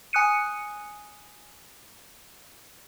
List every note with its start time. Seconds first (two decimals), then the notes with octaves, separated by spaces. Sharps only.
0.13 G#5 D#6 F#6 C#7 D#7